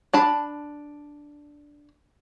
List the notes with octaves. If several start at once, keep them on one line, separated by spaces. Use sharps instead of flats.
D4 A5 B5